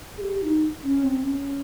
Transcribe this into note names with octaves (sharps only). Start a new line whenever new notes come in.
G#4
G4
D#4
C#4
C4
C#4